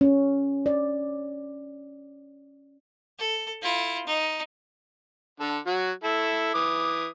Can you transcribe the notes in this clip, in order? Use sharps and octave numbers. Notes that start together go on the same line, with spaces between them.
C#4
D5
A4
E4 F4
D#4
D3 A4
F#3 F#4
E4 A4
E3 D6 D#6